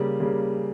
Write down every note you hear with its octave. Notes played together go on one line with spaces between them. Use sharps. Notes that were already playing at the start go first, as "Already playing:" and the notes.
Already playing: C#3 G3 A#3
C#3 G3 A#3